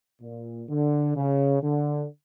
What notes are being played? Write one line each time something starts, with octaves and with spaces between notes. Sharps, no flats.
A#2
D3
C#3
D3